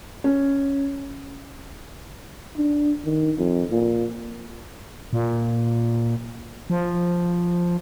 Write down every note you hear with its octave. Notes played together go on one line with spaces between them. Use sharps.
C#4
D4
D#3
F2
A#2
A#2
F3